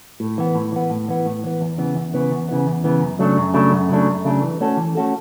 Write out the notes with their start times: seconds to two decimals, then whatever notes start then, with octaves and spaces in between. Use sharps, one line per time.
0.20 A2
0.38 E3 B3
0.55 A2
0.72 E3 B3
0.90 A2
1.08 E3 B3
1.26 A2
1.44 E3 B3
1.61 E2
1.78 C#3 E3 B3
1.95 E2
2.13 C#3 E3 B3
2.31 E2
2.49 C#3 E3 B3
2.67 E2
2.84 C#3 E3 B3
3.01 F#2
3.19 C#3 F#3 A3 D4
3.37 F#2
3.54 C#3 F#3 A3 D4
3.72 F#2
3.89 C#3 F#3 A3 D4
4.07 F#2
4.25 C#3 F#3 A3 D4
4.42 E3
4.60 A3 C#4 F#4 A4
4.77 E3
4.95 A3 C#4 F#4 A4